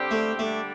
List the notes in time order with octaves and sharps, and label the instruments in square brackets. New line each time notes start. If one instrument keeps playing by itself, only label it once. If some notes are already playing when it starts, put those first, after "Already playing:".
Already playing: [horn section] D3 G3 C4 G4
[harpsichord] A3
[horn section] D3 G3 D4 [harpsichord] A3